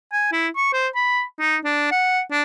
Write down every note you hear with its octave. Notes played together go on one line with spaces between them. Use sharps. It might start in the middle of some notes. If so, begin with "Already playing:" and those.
G#5
E4
C#6
C5
B5
D#4
D4
F#5
D4